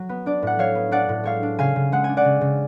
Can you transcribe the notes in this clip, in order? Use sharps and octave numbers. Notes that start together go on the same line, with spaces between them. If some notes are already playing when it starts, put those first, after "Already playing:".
Already playing: F#3
B3
D4 D5
A2 F#5
F#3 C#5 F5
B3
D4 D5 F#5
A2
G#3 C#5 F5
D4
C#3 F5 G#5
C#3
G#3 F#5
D4 G#5
D5 F#5
C#3
C#3